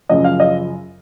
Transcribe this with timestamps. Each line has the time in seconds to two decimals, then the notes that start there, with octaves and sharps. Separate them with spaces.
0.09 F#2 C#3 F3 D#5
0.24 F5
0.40 D#5